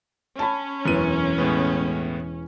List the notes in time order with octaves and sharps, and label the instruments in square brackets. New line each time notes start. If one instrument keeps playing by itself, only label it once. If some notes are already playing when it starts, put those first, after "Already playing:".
[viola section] C#4 [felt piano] A5 B5
[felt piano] E1 E3 B4 [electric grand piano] F#2 D#7
[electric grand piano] A2 G#3 B3